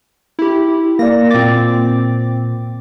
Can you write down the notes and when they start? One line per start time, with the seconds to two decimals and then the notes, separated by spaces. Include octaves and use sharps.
0.39 E4 G4
0.99 A#3 D5 A#6
1.31 A#2 C4 D6 A6